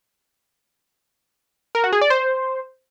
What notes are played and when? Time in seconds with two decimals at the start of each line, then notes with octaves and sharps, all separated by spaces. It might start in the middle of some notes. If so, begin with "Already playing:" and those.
1.75 A#4
1.84 F#4
1.93 G#4
2.01 D5
2.10 C5